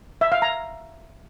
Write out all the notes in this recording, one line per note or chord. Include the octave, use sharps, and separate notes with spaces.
E5
F5
A#5